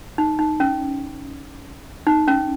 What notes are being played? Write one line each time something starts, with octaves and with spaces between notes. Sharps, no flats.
D#4
D#4
C#4
D#4
C#4